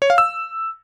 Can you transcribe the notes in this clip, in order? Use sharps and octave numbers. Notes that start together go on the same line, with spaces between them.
C#5
F5
E6